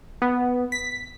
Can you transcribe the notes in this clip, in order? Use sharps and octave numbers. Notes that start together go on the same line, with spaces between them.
B3
B6